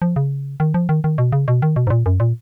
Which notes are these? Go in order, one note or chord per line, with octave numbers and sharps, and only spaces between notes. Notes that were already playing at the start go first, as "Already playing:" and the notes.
F3
C#3
D#3
F3
D#3
D#3
B2
C#3
B2
D#3
B2
G#2
A#2
F#2
A#2